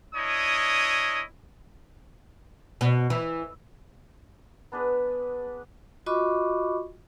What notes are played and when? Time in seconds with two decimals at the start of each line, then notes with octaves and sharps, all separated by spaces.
0.15 D4 E4 C#5 D#5 D#6
2.81 B2
3.10 E3
4.72 B3 D4 G#4 B4
6.06 F4 F#4 D#5 B5 C#6 D6